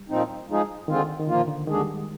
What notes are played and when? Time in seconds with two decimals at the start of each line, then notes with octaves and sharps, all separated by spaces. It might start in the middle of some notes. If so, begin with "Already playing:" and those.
Already playing: G3
0.09 A#2 F3 C4 D#4
0.48 F3 G#3 D#4 G#4
0.88 D2 D3 D#3 G#3 C4 F4
1.20 D#3
1.27 A#2 D3 F3 A#3 F4
1.48 D3
1.67 D#2 D3 D#3 G#3 D4 G#4
1.81 G3
1.94 G#3